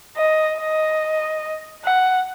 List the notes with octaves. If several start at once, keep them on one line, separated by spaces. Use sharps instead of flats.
D#5
D#5
F#5